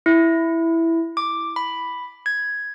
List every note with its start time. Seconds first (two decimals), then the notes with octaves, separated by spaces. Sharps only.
0.06 E4
1.17 D6
1.56 B5
2.26 G#6